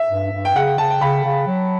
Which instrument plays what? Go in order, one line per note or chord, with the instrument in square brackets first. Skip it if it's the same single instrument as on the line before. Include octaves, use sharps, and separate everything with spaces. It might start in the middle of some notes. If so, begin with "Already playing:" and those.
Already playing: [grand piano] E5
[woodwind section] G2
G2
[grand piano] G5
[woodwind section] C#3 [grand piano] F#5
[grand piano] G5
[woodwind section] C#3 [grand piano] A5
[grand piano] G5
[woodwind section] C#3 [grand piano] B5
[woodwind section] C#3
F#3